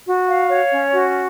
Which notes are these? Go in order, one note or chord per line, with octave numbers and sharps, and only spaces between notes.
F#4
F5
C#5
C#4
F#4